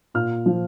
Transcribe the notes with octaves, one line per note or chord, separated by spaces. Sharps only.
A#2 F6
F3